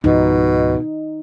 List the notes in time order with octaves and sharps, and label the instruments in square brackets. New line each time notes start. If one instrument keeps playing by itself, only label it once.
[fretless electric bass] C#2 G#2 F3 [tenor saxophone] B2 [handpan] D#4